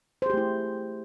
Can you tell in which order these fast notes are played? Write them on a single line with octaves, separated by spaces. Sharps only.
C5 G#4 G4 A3 E4